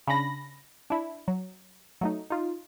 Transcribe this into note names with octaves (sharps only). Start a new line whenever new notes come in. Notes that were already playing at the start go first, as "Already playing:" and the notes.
C#3 C#4 D4 B5 A#6
D4 E4
F#3
F#3 A3 D#4
D#4 F4